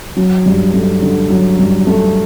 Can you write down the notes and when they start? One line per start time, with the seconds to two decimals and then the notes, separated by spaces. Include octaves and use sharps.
0.16 F#3
0.46 G2
0.73 A3
1.02 D3
1.30 F#3
1.59 G2
1.87 A3